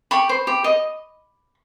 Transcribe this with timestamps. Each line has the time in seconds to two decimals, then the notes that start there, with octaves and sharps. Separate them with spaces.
0.11 G4 B5 C#6
0.29 C5
0.47 G4
0.64 D#5